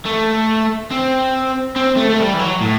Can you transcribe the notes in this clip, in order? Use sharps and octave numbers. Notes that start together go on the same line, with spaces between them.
A3
C4
C4
A3
A3
G3
E3
F#3
A2